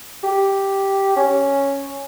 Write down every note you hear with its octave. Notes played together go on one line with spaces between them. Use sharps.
G4
C#4